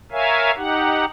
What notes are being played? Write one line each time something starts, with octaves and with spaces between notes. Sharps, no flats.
A#4 C#5 E5 F5 G#5
D#4 G4 F#5